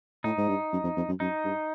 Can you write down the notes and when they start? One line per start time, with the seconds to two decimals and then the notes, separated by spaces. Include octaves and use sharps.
0.24 A2 D#4
0.38 G#2
0.48 G2
0.72 F#2
0.84 F2
0.97 F2
1.08 F#2
1.20 F#2 D#4
1.44 G2